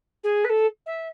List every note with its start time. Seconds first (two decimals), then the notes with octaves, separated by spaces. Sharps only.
0.24 G#4
0.44 B4
0.49 A4
0.86 E5